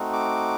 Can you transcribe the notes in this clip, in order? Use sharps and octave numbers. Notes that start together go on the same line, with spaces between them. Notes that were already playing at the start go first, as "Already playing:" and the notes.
Already playing: A3 C4 D#4 F#4
D6